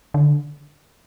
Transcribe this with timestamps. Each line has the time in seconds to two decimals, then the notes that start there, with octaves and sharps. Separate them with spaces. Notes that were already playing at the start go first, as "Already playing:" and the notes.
0.14 D3